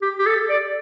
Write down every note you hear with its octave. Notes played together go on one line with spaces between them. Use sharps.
G4
G4
A4
D5